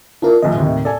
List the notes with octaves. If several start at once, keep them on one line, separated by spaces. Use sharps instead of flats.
D4 E4 F4 A#4
D#1 A#1 A2 D#5
D#2 A2 C3
A4 D5 G#5